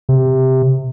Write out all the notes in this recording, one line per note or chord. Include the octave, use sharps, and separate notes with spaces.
C3